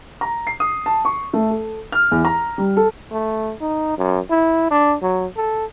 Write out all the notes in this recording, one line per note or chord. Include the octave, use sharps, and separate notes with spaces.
A#5
C7
D#6
A5
C#6
A3
A4
F6
E2
A#5
G3
A4
A3
D#4
F#2
E4
D4
F#3
A4